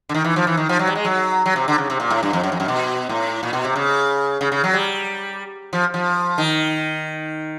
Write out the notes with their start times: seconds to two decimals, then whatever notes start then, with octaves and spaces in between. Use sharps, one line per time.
0.09 D3
0.14 D#3
0.24 E3
0.36 F3
0.47 E3
0.57 D#3
0.69 F3
0.79 F#3
0.87 G3
0.95 G#3
1.05 F#3
1.46 F#3
1.56 C3
1.68 D3
1.78 C#3
1.90 C3
2.00 A#2
2.10 A2
2.23 G2
2.33 F2
2.43 F#2
2.52 F2
2.60 F#2
2.68 B2
3.09 A2
3.43 A#2
3.53 B2
3.64 C3
3.76 C#3
4.41 C#3
4.52 C#3
4.64 F#3
4.73 G3
5.73 F3
5.94 F3
6.38 D#3